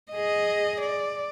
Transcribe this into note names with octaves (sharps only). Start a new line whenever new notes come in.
G#4 D#5
D5